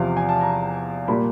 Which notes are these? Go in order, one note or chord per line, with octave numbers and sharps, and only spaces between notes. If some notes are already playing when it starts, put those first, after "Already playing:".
Already playing: E2 C3 F3 F5
G#5
A5
A#5
A#2 G3 A#3 B5